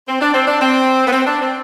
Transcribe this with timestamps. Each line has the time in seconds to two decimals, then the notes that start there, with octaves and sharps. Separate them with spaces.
0.08 C4
0.21 D4
0.34 C4
0.47 D4
0.61 C4
1.07 B3
1.11 C4
1.27 D4
1.42 C4